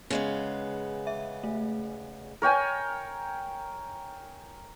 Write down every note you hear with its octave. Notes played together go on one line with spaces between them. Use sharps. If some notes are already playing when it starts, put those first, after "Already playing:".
C#3 G#3 B3
E5
A3
A#4 C#5 G5 G#5